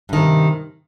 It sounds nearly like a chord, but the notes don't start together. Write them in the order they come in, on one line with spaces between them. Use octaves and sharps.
G2 D#3 C3